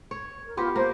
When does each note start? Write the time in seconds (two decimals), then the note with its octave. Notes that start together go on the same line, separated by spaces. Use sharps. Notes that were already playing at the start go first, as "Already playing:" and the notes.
0.11 C#5
0.45 A#4
0.57 B3 F4 G4 C5
0.76 A#3 C5